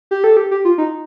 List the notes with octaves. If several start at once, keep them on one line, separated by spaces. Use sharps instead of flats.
G4
A4
G4
G4
F4
D#4